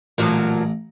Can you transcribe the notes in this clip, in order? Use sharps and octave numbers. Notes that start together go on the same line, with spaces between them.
A1 A#2 F3 F#3 A#5